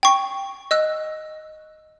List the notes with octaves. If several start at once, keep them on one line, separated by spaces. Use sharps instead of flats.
G5 C#6
D#5 E6 F#6